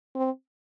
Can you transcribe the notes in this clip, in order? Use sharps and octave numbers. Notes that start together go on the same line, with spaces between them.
C4